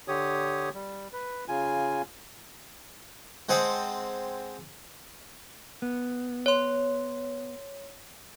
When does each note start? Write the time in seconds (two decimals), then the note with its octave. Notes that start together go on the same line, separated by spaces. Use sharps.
0.08 D3 G4 C#5 D#6
0.74 G3
1.13 B4
1.48 C#3 F4 G#5
3.49 G#3 C4 C5 F#5 A5 D#6
5.82 B3
6.46 C#5 C6